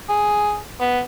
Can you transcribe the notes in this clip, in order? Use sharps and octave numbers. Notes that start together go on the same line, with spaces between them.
G#4
B3